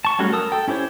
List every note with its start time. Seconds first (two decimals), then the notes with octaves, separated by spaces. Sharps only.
0.05 A5 C#6
0.19 F#3 G3 A3 C#4 F#4
0.32 A#4 A5 D#6 E6
0.52 A4 G5
0.68 C#4 E4 G4 C5 C#5